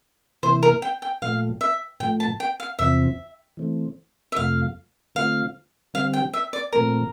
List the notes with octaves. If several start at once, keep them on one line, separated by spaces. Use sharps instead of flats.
C3 E3 A#3 E4 C5
A#4
G5
G5
A#2 F3 A3 F5
E5
A2 F3 A3 G5
A5
G5
F5
E2 C3 F3 C4 E5
E3 A3 C4
E5
F2 C3 F3 A3 F5
D3 A3 C4 F4 F5
D3 G3 C4 F5
G5
E5
D5
A#2 F3 A3 C4 A#4